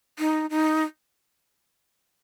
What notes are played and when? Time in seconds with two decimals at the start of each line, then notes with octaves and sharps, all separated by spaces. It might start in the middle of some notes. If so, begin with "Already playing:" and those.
0.19 D#4
0.50 D#4